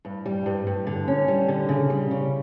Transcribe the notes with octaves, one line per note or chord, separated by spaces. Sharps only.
G2
G3
G2
G2
D3
C#4
G3
D3
C#3
G3
C#3